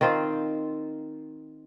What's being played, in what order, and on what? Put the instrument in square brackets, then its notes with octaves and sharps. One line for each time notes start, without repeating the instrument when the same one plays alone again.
[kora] D#3 C4 F4 C5